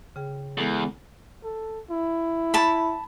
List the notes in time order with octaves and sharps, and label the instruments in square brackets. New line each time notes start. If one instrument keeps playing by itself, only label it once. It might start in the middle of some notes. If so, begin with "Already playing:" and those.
[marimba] C#3 G#4 G5
[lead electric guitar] E2 [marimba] G#3 B3 A4
[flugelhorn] A4
E4
[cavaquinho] A5 B5